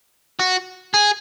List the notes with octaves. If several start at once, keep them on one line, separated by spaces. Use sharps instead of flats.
F#4
G#4